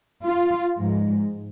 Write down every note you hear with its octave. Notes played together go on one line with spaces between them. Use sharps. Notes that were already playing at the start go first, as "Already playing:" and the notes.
F4
G#2 F3 G#3